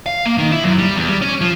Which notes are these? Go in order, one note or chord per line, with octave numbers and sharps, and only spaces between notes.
F5
A#3
D#3
E4
F#2
G3
E2
G3
C#4
F3